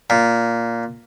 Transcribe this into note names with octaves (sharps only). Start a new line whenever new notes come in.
A#2